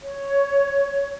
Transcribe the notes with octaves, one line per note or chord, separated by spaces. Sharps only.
C#5